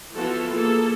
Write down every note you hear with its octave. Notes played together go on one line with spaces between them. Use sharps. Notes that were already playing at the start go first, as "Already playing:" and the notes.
E3 F3 B3 F4 F#4 A4
A#3 G#4 A4